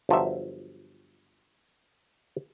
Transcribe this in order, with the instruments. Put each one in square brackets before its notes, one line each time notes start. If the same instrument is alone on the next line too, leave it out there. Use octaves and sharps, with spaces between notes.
[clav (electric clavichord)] G1 F3 F#3 E5